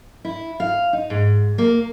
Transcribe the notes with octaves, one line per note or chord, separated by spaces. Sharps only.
E4
F5
D#4
G#2
A#3